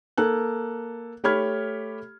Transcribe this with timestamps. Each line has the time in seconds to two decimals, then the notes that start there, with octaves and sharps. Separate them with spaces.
0.18 A#3 A4 F#6
1.24 A3 G4 C#5 B5 F6 G#6